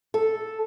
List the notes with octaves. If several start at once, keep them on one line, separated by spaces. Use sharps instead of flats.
A4